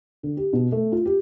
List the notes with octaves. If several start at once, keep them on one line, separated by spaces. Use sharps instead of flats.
D3
G4
B2
A3
F4
G4